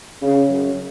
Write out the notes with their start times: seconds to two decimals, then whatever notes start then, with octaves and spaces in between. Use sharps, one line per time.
0.21 C#3
0.49 F#2